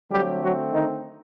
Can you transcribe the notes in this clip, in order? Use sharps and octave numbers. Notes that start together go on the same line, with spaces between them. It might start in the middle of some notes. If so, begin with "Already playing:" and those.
D3 F#3 G3 A3 C4 G4
F#3 F#4
D#3 D#4